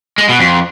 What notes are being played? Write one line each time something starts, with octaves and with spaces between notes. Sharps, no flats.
G#3
B2
F2